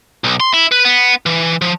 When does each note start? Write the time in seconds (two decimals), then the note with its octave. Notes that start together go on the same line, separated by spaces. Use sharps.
0.24 B1
0.40 C6
0.54 E4
0.72 B4
0.85 B3
1.26 E3
1.62 F3